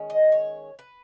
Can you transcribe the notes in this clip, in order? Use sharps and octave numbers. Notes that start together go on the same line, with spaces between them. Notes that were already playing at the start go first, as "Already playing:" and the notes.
Already playing: D#3 G#3 C#4
D#5
C#5
B4